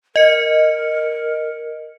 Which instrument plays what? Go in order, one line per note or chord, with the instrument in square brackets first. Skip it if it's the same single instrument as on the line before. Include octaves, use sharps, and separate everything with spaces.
[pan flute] A#4 [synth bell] D#5 C#7